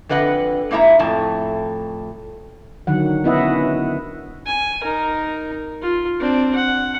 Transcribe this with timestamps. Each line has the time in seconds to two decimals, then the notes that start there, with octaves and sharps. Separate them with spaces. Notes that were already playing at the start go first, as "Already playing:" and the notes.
0.09 F2 D3 B4 D#5 F#5
0.71 G#2 A#3 E4 E5 A#5
0.99 F2 A2 A5
2.87 D3 D#3 F#3 F#5
3.24 B3 C#4 E4 D#5 E5 F#5
4.46 G#5
4.83 D#4 A#4
5.82 F4
6.20 C4 D4
6.55 F#5